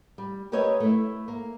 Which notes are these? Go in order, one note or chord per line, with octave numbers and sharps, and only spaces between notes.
G3
G4 A#4 B4 C#5 D#5 E5
A3 E4
A#3